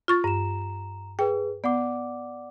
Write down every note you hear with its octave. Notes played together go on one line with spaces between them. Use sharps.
F4 C#6 A6
G2 A#5 E7
G#4 B4 G5
B3 D5 F#5 D6